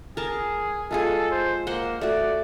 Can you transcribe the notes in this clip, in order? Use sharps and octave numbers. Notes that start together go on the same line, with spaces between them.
G#4 A#4 A5
G#3 F4 G#4 A4
C5
A#3 C5 F#5 C6
A3 F#4 D5